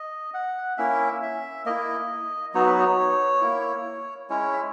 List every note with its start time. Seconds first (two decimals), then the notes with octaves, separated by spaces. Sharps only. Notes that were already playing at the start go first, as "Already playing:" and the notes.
Already playing: D#5
0.34 F#5
0.78 A#3 C#4 E4 E5
1.23 E5
1.66 A#3 E4 D#5
2.54 F#3 B3 D#4 F#4 C#5
2.66 B4
2.79 C#5
3.41 A#3 E4
4.30 G#3 C#4 E4 C#5
4.53 E5